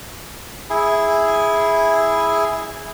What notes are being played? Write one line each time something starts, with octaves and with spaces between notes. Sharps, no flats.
E4 G#4